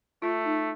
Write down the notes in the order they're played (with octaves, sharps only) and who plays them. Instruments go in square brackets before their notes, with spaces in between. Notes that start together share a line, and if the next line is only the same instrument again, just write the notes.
[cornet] A3 [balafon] F4
[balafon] D#4